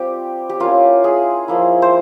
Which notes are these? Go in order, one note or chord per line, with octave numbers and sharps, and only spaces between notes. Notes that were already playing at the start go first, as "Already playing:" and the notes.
Already playing: G3 C4 F4 G4
G4
A#3 C#4 E4 F4
G#4
F3 A#3 E4
C5